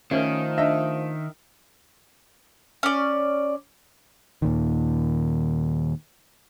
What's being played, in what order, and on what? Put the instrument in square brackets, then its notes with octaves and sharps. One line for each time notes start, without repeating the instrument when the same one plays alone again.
[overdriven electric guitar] D#3 [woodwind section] F3 A3 [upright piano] C#4 [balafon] A#4 C5 E5
[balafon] D4 D#5 [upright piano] E5
[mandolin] C#4 D5
[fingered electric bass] D#2 A#2 D#3